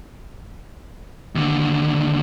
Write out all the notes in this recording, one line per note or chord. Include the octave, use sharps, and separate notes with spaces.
D#2 D3